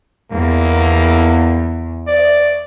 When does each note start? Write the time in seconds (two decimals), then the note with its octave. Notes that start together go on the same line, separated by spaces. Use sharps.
0.32 E2 A#3
2.07 D5